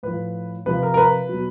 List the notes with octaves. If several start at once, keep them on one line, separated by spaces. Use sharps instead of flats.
A2 F3 B4
C3 F3 B4
A#4
A#4
B4
B2 F#3